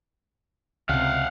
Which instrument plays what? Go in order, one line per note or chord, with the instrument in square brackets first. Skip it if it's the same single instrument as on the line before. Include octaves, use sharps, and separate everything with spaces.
[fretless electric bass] C#2 C3 [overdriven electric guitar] F5 F#5